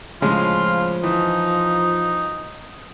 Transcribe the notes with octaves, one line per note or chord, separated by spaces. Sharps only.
A2 C#3 F3 G#3 F4
E3 D#4